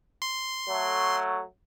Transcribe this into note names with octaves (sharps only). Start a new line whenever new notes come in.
C6
F#3 A3